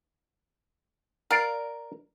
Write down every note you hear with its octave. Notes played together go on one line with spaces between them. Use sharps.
A#4 D5 F5